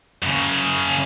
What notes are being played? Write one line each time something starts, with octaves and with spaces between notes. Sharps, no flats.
F#2 C#3